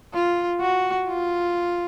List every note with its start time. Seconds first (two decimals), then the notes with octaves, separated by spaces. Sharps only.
0.14 F4
0.61 F#4
1.07 F4